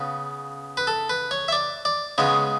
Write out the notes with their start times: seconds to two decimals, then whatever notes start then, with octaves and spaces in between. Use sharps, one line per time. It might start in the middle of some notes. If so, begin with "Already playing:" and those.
Already playing: C#3 B3
0.77 B4
0.87 A4
1.10 B4
1.31 C#5
1.48 E5
1.52 D5
1.85 D5
2.18 C#3 G#3 B3 C#5